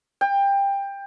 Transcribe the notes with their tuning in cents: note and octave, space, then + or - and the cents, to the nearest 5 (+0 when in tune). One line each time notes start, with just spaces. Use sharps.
G5 +20